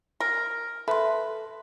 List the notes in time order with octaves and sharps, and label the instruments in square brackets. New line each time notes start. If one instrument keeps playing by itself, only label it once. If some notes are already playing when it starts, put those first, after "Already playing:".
[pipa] A#4
[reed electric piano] A4 [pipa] B4 [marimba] E5 C6